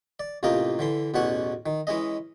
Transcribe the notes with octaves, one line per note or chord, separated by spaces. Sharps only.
D5
A1 C3 A#3 F4 D#5 G5
D3 E3 C6
A1 E2 B2 C#4 F#5 G#5
D#3
E3 G#3 C#4 D#5